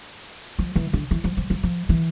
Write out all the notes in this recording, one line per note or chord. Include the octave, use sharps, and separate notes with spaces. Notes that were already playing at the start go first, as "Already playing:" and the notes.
F3
E3
D3
E3
F3
F3
F3
F3
E3